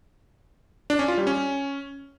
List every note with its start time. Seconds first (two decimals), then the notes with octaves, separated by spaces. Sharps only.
0.90 D4
0.99 C#4
1.08 F4
1.18 G3
1.27 C#4